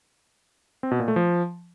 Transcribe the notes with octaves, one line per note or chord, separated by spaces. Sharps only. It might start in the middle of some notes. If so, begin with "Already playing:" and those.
C4
B2
A#2
A3
F3